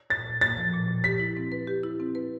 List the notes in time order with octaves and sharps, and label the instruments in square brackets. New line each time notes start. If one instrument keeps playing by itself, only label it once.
[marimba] A#2 [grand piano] A6
[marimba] A#2
[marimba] A#3 [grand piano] A6
[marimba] F3
A#2
A#2
[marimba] G4 [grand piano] B6
[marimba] E4
C4
B4
G4
E4
C4
B4